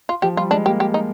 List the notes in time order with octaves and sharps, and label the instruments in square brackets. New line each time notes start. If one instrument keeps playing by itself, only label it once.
[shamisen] F4
[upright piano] F3 [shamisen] G4
[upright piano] G3 [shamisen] F4
[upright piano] G#3 [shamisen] D4
[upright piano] A#3 [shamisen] G4
[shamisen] G4
D#4